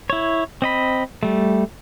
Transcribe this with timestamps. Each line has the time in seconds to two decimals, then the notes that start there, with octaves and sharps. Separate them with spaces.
0.10 E4 C#5
0.62 C4 D#5 B5
1.23 G3 A3